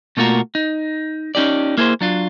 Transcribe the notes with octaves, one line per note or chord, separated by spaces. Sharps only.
B2 A3 A#3 F4 F#4 A#4
D#4
C#4 D#4 G4 D5
A#3 E4 G#4 A4 C5
F#3 D4 F4